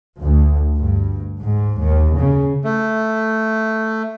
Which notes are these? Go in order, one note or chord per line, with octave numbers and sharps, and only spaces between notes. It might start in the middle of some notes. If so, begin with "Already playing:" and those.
D2
G2
G#2
D#2
C#3
A3